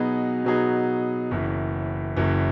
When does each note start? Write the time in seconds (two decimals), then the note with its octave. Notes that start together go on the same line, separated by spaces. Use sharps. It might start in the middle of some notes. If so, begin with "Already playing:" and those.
Already playing: B2 F#3 B3 D#4 G#4
0.44 B2 F#3 B3 D#4 G#4
1.31 F#1 F#2 E3
2.17 F#1 F#2 E3